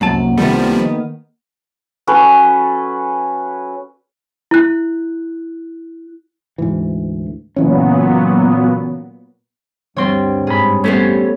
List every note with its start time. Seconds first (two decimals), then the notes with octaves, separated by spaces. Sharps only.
0.01 F1 C2 F#2 F#3 A#3 F#5 A5
0.38 C2 C3 D#3 F3 G3 A3 B3
0.81 D#3
2.07 F#3 C#4 A4 B4
4.51 E4 F#6
6.58 D2 G#2 E3
7.56 A#2 C#3 E3 F#3 B3 C#4
9.96 D2 G2 G3 C4 C#5 C6
10.47 G#2 G#4 B5
10.84 G3 A3 B3 C#4 G4 A4 C5 C#5